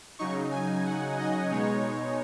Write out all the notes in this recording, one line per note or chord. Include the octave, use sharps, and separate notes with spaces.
C#3 F#3 D#4 C#6
G#5
F#5
D#5
B2 G#3 D#4 C#5